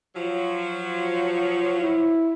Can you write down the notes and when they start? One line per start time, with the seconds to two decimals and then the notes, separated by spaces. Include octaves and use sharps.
0.15 F3 F#3
1.75 E4